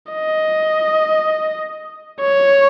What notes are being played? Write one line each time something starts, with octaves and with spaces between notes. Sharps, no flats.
D#5
C#5